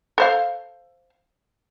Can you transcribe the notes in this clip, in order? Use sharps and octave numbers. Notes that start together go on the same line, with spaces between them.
A4 C5 F5